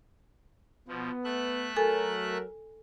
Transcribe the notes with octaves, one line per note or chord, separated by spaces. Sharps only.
B2 F3 B3
A3 E5 F#6
F#3 A4 A#4 G#5